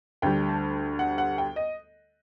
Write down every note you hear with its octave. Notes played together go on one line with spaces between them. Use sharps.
D2 D3 G3 G5
A5
F#5
F#5
G5
D#5